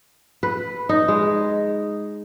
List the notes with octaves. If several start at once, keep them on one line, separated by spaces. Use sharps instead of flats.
B4
D#4
G#3